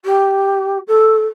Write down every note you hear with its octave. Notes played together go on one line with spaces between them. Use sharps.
G4
A4